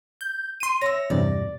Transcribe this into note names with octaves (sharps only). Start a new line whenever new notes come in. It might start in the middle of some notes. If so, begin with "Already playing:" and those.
G6
C6 D#7
C#5 E5 A#6
E2 G2 C3 D5